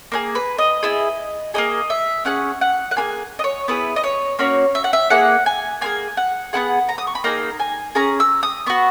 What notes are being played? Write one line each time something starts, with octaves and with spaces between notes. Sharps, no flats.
A#3 D#4 G#4
B4
D#5
B3 E4 G#4
A#3 D#4 G#4 D#5
E5
C#4 G#4 F#5
F#5
F#5
A#3 E4 G#4 G#5
D#5
C#5
B3 E4 G#4 B4
D#5
C#5
A#3 C#4 F#4 C#5
E5
F#5
E5
A#3 E4 G#4 F#5
G#5
A#3 E4 G#4 G#5
F#5
B3 E4 G#4 F#5
A#5
D#6
C#6
B5
A#3 D#4 G#4 A#5
G#5
C#4 G#4 A#5
E6
D#6
B3 F#4 C#6